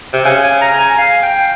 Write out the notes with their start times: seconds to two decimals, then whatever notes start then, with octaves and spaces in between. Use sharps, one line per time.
0.13 C3
0.25 C#3 G#5
0.44 G#5
0.62 A#5
0.80 G#5
0.98 F5
1.23 G5